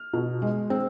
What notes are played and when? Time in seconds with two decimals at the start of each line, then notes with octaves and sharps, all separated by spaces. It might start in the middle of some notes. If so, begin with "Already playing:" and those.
Already playing: F6
0.13 B2
0.42 G#3
0.70 C4